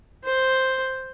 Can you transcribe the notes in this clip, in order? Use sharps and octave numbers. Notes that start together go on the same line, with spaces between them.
C5